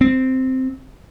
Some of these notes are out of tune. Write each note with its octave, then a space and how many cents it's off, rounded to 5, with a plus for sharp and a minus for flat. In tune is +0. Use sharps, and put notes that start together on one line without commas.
C4 -5